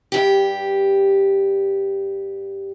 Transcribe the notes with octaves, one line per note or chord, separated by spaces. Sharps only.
G2 G4